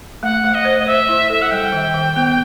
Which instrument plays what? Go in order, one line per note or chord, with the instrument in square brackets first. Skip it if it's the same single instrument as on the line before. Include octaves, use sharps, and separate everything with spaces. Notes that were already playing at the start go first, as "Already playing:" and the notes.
[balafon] A3 [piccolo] F#5
[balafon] A3
[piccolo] D#5
[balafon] C5
[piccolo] D#5
[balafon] C5 [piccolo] E5
[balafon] E4
[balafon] A4 [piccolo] E5
[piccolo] F#5
[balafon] G3 [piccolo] G5
[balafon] D#3
D#3
B3